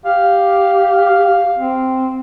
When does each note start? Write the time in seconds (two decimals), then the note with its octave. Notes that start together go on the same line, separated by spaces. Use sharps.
0.06 G4 F5
1.58 C4